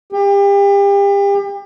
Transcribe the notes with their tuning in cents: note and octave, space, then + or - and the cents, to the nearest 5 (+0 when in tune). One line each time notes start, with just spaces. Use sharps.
G4 +35